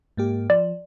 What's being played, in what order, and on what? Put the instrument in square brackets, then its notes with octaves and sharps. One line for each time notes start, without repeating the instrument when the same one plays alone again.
[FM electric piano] G#2 A#3 G4
[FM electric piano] F3 [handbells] D5